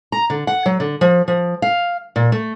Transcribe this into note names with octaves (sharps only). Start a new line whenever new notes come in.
A#5
D3
F#5
F#3
D3
F3
F3
F5
A#2
A3